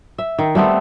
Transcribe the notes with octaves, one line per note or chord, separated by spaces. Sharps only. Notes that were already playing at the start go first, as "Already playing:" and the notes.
E5
D#3
G3 A3 B3 C4